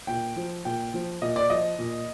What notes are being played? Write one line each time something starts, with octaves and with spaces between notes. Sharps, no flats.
A#2 G5
F3
A#2 G5
F3
A#2 D#5
D5
F3 D#5
A#2